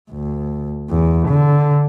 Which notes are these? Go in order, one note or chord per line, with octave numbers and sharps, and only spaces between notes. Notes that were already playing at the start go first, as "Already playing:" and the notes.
D2
E2
D3